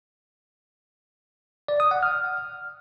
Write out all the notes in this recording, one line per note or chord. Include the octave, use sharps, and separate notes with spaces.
D5
D#6
F#5
F6